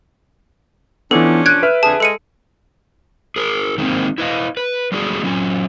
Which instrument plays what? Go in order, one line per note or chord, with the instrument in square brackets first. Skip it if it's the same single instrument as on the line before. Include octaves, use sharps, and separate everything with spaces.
[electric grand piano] E3 B3 [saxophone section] F3 C#4 D4 [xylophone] A4
[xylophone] F#6 G#6 [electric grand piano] D7 D#7
[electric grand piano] B4 E5 F6
[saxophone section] F2 D3 G#4 [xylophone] A5
[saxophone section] G#3 [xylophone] A4 C#7 D#7
[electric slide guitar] G#4 A#4
D#3 G#3 A#3 C4
E4 B4 D#5 F5
B4
G3 G#3 D4 F#4 G#4 A4
F#3 C#4 F4